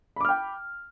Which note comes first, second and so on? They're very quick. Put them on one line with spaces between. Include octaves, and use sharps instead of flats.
B5 D6 F6 G5